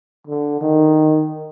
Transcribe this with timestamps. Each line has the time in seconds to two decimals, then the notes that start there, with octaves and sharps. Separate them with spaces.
0.27 D3
0.61 D#3